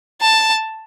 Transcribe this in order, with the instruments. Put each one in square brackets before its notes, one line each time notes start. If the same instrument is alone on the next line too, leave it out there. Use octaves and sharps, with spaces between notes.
[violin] A5